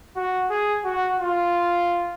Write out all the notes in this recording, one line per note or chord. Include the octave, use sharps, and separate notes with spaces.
F#4
G#4
F#4
F4